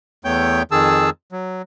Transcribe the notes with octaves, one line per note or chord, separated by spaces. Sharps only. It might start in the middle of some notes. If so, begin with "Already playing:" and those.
E2 A3 B3 C#5 G5 G6
F2 D#3 G#4 A5 E6
F#3